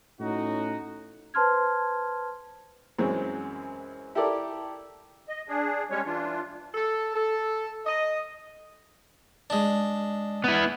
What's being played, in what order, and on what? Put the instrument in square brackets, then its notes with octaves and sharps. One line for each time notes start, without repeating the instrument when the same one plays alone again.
[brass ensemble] A2 C#4 D#4 F#4
[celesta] B4 C5 A5 C6 F6 G#6
[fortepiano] F#2 E3 F#3 G#3 C4
E4 G4 A4 A#4 D5
[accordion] D#5
D4 G#4
G3 G#3 C#4 C#5
E3 D4 F4
[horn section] A4
A4
D#5
[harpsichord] G#3 D4
[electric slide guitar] B3 E4